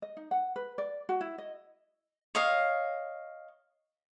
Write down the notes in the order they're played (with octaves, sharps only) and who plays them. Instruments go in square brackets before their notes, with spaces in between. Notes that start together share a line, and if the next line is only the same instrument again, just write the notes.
[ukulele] D#5
D#4
F#5
B4
D5
F#4
E4
D#5
[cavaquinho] C#5 D#5 F5